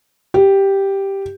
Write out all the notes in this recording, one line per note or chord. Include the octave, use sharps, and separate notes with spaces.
G4